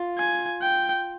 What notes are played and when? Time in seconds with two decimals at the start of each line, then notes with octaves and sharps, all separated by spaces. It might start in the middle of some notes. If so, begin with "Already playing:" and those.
Already playing: F4
0.18 G#5
0.62 G5